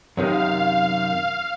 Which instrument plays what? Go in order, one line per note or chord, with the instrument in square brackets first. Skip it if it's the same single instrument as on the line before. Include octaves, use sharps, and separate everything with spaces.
[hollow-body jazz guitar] F#2 C3 D#3 [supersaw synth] F5